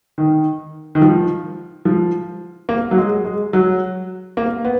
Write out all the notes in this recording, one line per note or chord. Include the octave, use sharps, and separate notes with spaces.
D#3
D#3
F3
F3
A#3
F#3
G#3
G#3
F#3
A#3
B3